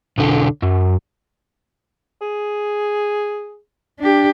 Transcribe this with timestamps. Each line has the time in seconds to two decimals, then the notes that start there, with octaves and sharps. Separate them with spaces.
0.18 B1 D3
0.62 F#2
2.21 G#4
4.00 D4 G4